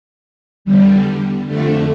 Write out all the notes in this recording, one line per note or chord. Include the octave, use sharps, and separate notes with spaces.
E2 D3 G3
F2 D3 A3